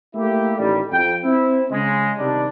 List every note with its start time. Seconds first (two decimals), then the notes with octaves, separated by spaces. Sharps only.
0.15 A3 A#3 E4 G4
0.58 A1 D#3 G3
0.92 F2 G5
1.25 C4 E4
1.71 C#3 G#3
2.19 C3 D#3 G3 D4